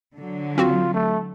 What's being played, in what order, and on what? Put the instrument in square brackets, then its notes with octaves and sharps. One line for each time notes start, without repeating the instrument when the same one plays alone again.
[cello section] D3 F#3
[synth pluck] C4 F#4 [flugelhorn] F4
[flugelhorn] A3